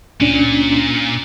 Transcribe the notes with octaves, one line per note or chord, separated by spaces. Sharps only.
C#2 A#2 C#4 D4